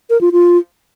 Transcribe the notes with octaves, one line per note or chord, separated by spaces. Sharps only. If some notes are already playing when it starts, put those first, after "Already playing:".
A#4
F4
F4